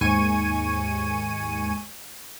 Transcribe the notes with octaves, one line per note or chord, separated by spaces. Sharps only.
D#2 G#2 G#5 C#6 D#7